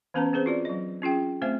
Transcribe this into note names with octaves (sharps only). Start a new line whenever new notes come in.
E3 B3 C#4 B4 A5 A#5
C4 G#4 B4 C5
F4 F#4 D5
F#3 D#5
C#4 F4 G#4 G5
A3 C4 C5 E5 G#5